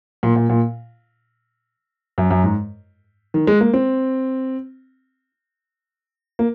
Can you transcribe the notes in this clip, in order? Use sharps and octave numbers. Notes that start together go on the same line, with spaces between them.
A#2
A#2
A#2
F#2
F#2
G#2
D#3
G#3
A#3
C4
A#3